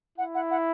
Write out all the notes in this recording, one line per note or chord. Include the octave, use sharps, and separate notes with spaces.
E4 F#5
F#5
F#5